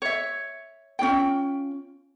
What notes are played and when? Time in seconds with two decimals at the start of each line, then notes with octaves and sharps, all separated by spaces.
0.02 C#5 E5
0.99 C#4 D4 F4 G5